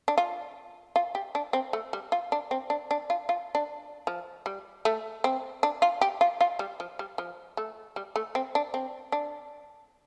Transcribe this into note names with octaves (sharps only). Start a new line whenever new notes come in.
D4
F4
F4
G4
D4
C4
A3
G3
F4
D4
C4
D4
D4
F4
F4
D4
F3
G3
A3
C4
D4
F4
G4
F4
F4
G3
F3
G3
F3
A3
G3
A3
C4
D4
C4
D4